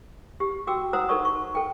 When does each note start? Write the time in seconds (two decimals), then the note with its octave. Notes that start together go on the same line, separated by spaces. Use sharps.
0.40 G4
0.67 F#4 G5 D6 E6
0.93 C5 F#5 A#5 D#6 E6
1.09 D#4 A4 A#4 D5 C#6 D#6
1.25 C#6
1.55 A4 G5